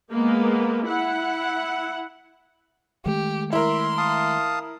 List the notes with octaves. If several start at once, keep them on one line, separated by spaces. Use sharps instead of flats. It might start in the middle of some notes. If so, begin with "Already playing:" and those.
G#3 A#3 B3
E4 F#5
D#3 G#3 A3 G4
E4 A#4 E5 C6
F5 A5 D#6